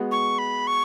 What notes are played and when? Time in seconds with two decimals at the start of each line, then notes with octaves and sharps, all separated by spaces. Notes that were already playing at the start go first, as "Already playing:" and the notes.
Already playing: G#3 B3 F#4
0.12 C#6
0.38 B5
0.67 C#6